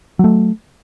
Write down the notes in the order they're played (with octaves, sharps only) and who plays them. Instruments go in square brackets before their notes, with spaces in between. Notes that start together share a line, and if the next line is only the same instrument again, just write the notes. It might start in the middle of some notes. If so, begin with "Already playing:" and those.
[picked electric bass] F#3 A3